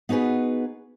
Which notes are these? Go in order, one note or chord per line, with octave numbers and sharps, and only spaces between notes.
B3 D#4 F#4 G#4 B4